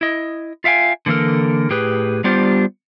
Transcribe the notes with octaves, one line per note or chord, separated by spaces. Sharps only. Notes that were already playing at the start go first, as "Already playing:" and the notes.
E4 D#5
F4 E5 F5 G5 G#5
D3 E3 A#3 A4 A#4
A2 G4 G#4 B4
G3 B3 D4 F4 G4 C5